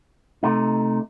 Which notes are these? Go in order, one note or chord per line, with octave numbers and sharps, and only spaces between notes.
C3 A3 D#4